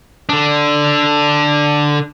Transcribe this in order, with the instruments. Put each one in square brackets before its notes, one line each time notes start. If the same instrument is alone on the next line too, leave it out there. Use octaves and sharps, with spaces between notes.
[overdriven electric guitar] D3 D4